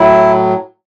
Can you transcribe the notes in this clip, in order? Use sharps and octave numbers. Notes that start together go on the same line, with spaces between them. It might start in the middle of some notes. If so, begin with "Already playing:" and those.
Already playing: A2 F#3 E4